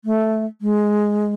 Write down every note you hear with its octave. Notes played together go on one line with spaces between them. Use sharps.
A3
G#3